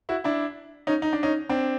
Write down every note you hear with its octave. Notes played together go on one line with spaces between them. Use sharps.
E4 F#4
D4 E4
C#4 D#4
D#4
D4
C#4 D#4
C4 D4